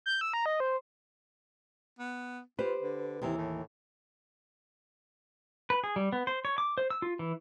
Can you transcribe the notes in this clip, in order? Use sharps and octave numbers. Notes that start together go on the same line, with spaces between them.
G6
E6
A#5
D#5
C5
B3
F4 G4 B4 C5
D3
D#2 C3 E3
A2
B4
G#4
G3
B3
C5
C#5
D6
C5
E6
F4
E3